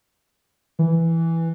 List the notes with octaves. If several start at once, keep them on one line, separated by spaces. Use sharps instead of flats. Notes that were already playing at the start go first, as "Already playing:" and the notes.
E3